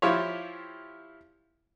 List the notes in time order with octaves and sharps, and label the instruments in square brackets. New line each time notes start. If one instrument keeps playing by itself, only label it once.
[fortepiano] F3 E4 F4 G4 C5 C#5